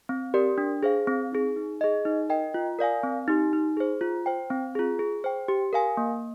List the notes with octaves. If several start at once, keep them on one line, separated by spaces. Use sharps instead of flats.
C4
G4 A#4 D5
D4
G#4 C5 F5
C4
D#4 G#4
D#4
G#4 D#5
D#4
A#4 D#5 G5
F4
A#4 D5 F5 G#5
C4
D#4 G4
D#4
G#4 C5
F4
C5 G5
C4
F4 G#4
G#4
C5 G5
G4
A#4 F5 G#5
A#3